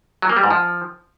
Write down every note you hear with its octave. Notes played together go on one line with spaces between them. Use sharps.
F#3
A#3
G3
G#2
F3